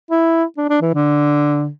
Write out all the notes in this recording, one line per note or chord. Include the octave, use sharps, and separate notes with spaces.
E4
D4
D4
E3
D3